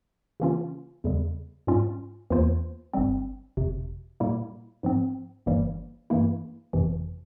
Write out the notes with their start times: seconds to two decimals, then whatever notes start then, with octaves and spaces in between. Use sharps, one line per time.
0.40 C#3 E3 A#3 C#4 F4
1.04 E2 C#3 G3
1.67 G#2 G3 C#4 F4
2.30 E2 E3 A#3 F4 C5
2.93 G1 G2 G3 C4
3.57 G1 F2 C3
4.20 A#2 G3 A#3 E4
4.83 G#2 F3 C4
5.46 G1 G2 E3 G3 A#3
6.10 G2 E3 A#3 E4
6.73 G1 F2 C3 E3